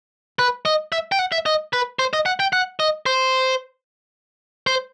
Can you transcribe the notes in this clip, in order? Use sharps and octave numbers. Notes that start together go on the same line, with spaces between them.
B4
D#5
E5
G5
F#5
E5
D#5
B4
C5
D#5
F#5
G5
F#5
D#5
C5
C5